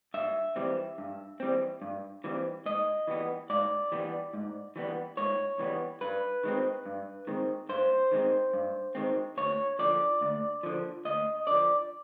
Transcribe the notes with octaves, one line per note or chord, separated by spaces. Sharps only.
G2 E5
E3 G3 C4
G2
E3 G3 C4
G2
E3 G3 C4
G#2 D#5
E3 G3 B3
G#2 D5
E3 G3 B3
G#2
E3 G3 B3
G#2 C#5
E3 G3 B3
G2 B4
D#3 G#3 C4
G2
D#3 G#3 C4
G2 C5
D#3 G#3 C4
G2
D#3 G#3 C4
D2 C#5
D3 F3 D5
D2
D3 F3
D2 D#5
D3 F3 D5